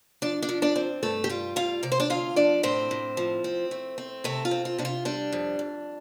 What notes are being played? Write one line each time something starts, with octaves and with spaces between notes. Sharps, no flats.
F3 D4 D5
D4 D5
F3
D4 D5
C4
G2 A3 A4
G4
G3 F4
G2 F4 F5
C3 D5
C5
D4 D5
D2 F4 F5
F3 D4 D5
A2 C4 C5
A2
F3
C4
A3
C4
C3 A3 A4
F4
C4
F4
C3 D4
F4
G3 D4
F2
F2